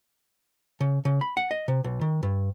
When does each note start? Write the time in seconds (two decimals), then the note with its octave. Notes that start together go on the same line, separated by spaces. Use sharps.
0.80 C#3
1.05 C#3
1.21 B5
1.37 F#5
1.51 D#5
1.68 C3
1.84 B1
2.01 D#3
2.23 G2